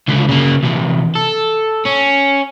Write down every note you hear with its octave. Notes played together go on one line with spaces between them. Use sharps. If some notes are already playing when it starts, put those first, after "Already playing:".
C#2 D3
C#3 A#3
E2 C3
A4
C#4